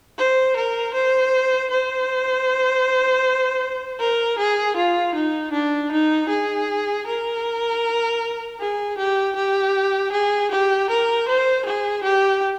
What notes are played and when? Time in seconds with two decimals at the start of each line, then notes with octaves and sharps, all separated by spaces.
0.18 C5
0.56 A#4
0.94 C5
1.70 C5
4.00 A#4
4.39 G#4
4.77 F4
5.15 D#4
5.53 D4
5.92 D#4
6.29 G#4
7.07 A#4
8.60 G#4
8.97 G4
9.35 G4
10.12 G#4
10.51 G4
10.90 A#4
11.28 C5
11.65 G#4
12.03 G4